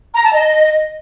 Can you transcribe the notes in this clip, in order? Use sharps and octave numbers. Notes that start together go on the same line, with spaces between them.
A#5
A5
D#5